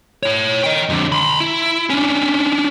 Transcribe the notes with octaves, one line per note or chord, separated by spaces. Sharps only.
E4 C#5
D#5 G5
F2 D3
B5 C6
E4
C#4 D4